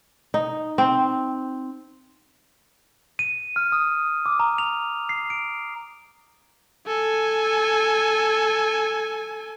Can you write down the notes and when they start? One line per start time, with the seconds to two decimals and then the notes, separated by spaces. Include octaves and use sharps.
0.34 D#4
0.78 C4
3.19 D#7
3.56 F6
3.72 D#6
4.26 D6
4.40 A#5
4.58 F7
5.09 C7
5.30 D7
6.87 A4 G#5